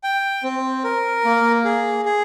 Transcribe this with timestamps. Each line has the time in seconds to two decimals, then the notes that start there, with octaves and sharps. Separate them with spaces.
0.03 G5
0.43 C4
0.84 A#4
1.25 A#3
1.65 G#4
2.05 G#4